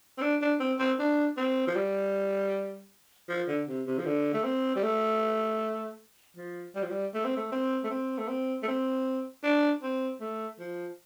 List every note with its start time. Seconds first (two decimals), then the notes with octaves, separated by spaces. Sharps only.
0.18 C4
0.22 D4
0.42 D4
0.60 C4
0.79 C4
0.99 D4
1.37 C4
1.67 F3
1.76 G3
3.29 F3
3.48 D3
3.68 C3
3.87 C3
3.99 F3
4.06 D3
4.34 A3
4.44 C4
4.76 G3
4.84 A3
6.37 F3
6.75 G3
6.83 F3
6.91 G3
7.14 A3
7.25 C4
7.37 A3
7.52 C4
7.84 A3
7.91 C4
8.18 A3
8.28 C4
8.63 A3
8.68 C4
9.44 D4
9.83 C4
10.21 A3
10.59 F3